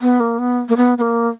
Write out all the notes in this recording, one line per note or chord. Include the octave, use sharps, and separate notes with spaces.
B3
A#3
B3
A#3
B3
B3
A#3